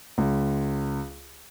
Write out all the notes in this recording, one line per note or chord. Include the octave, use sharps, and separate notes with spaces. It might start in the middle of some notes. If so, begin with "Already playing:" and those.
C#2